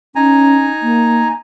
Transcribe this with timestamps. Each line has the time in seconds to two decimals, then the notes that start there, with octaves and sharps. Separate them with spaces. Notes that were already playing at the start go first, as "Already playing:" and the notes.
0.16 C#4 D#4 G#5 A#5
0.83 A#3